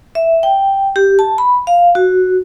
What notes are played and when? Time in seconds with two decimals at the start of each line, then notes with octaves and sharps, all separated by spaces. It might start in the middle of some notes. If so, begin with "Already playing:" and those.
0.15 E5
0.43 G5
0.96 G4
1.19 A5
1.38 B5
1.67 F5
1.95 F#4